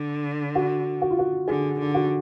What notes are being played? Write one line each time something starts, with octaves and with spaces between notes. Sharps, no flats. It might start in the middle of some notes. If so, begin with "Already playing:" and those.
Already playing: D3
F#4
F#4
F4
F#4
D3 G#4
D3
F#4